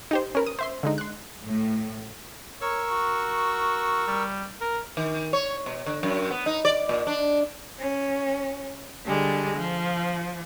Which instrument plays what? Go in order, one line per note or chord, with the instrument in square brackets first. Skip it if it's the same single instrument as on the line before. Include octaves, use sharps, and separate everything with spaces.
[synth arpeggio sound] D#4 G4 C5
C#4 A#4 B4
D#6
C5 E5 C6
D3 G#3 D#4
C6 F#6
[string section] A2
[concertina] A#4 C#6 E6 [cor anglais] C#5
[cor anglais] F#4
G3
A#4
[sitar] D#3
C#5
B2
D3
F#2
B3
D#4
D5
A#2
D4
[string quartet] C#4
D3 G3 G#3
F3